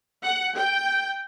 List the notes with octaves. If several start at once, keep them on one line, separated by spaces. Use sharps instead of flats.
F#5
G5